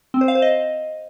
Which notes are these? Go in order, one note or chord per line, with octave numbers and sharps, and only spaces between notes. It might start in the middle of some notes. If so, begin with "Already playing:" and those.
C4
C5
F5
C5
D#5